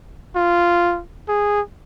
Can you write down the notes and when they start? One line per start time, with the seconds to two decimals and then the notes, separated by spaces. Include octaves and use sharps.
0.35 F4
1.28 G#4